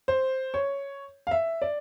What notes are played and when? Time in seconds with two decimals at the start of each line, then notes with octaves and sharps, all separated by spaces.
0.08 C5
0.54 C#5
1.27 F5
1.31 E5
1.62 D5